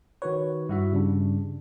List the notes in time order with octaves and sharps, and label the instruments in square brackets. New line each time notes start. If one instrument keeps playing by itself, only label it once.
[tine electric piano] D#3 F#4 B4 [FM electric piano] C#5
[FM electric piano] G2 [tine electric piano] E4 F#4 E5
[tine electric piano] C#3 G3 D4